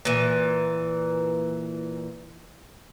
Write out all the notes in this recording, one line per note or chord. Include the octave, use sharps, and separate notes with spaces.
A#2 E3